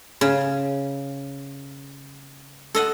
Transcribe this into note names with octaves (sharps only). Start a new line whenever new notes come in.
C#3
A4 D#5 F#5